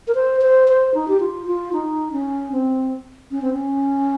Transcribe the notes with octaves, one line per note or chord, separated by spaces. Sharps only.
A#4
C5
C5
C5
D#4
G4
F4
F4
D#4
C#4
C4
C#4
C4
C#4